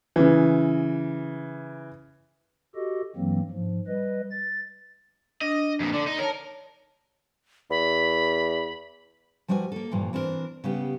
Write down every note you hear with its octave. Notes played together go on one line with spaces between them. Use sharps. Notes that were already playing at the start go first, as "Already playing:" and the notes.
C#3 E3
F#4 G4 A4 D#5
G2 E3 F#3 A#3 C4
G#2 F3
G3 B4 D#5
A6
D4 D#5
F2 A#2
D3 D5
D#4
A#4 C#5 A5
E2 B5
F3 G3 F#4 B4 C#5 G#5
A#3 A4
G2 A#2 E3 F3
E3 C4 D4 F4 A#4
C#3 G3 B3 G4